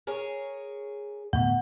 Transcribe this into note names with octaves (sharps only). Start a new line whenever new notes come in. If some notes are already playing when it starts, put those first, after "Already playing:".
G#4 A#4 C#5
A2 D3 B3 F#5